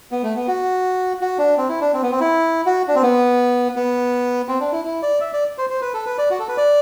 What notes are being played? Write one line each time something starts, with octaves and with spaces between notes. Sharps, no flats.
B3
A3
B3
F#4
F#4
D4
C4
E4
D4
C4
B3
C4
E4
F#4
D4
C4
B3
B3
C4
D4
E4
E4
D5
E5
D5
C5
C5
B4
A4
B4
D5
F#4
A4
B4
D5